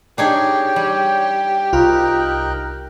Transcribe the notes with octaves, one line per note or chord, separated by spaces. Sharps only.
D4 D#4 G4 G#4 C#5 G5
G3
C2 D#4 F4 A#4 F#6